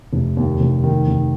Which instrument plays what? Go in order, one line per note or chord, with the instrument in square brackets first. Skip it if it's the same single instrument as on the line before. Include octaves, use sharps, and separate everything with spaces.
[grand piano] F1
D#2
F1
D#3
F1